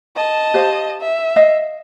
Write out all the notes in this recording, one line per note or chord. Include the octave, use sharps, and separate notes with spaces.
D#5 A5
G4 C5 F5
E5
D#5 F5